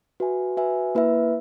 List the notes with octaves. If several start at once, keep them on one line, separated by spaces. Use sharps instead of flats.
F#4 B4 E5 G#5
F#4 B4 E5 G#5
A#3 E4 B4 E5